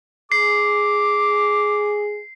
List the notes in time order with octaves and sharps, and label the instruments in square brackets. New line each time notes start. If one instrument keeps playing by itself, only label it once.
[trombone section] G#4 [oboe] D6 [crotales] C7